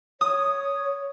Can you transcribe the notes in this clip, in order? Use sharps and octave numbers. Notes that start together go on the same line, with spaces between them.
C#5 D#6